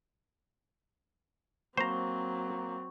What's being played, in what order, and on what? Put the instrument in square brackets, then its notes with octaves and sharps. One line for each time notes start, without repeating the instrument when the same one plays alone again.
[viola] F#3 C4 [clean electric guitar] A#3 [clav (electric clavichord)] C5 A#5 [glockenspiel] C#6